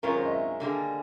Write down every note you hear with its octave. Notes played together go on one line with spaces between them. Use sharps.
F#2 D#3 G#3 C#4 F4 A#4
C5
D#5
E5
D3 G3 A#3 D#4 G#4